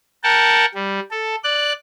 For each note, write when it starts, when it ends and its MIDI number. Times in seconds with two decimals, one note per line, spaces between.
0.24 0.65 70
0.24 0.65 78
0.24 0.65 79
0.24 0.65 81
0.74 1.00 55
1.11 1.35 69
1.44 1.73 74
1.44 1.73 90